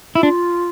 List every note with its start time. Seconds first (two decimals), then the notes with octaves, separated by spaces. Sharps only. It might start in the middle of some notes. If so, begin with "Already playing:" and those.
0.15 E4 F4
0.23 D4